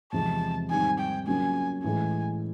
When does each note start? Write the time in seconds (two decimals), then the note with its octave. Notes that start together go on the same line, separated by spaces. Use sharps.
0.13 E2 C3 F3 G#3 C4 A5
0.70 G#2 D#3 G3 C4 G#5
0.99 G5
1.26 C#3 F#3 A#3 C#4 F4 G#5
1.84 A2 E3 G#3 G#5